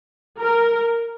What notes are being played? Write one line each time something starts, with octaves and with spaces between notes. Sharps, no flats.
A#4